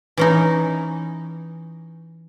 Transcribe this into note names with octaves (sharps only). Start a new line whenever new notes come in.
E3 C#4 D#4